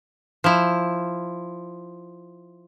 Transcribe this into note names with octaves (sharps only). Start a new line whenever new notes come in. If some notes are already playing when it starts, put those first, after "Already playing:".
F3 E4